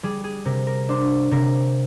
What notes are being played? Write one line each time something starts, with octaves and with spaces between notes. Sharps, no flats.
G3 G#4
G#4
C3 A#4
A#4
D4 C5
C3 A#4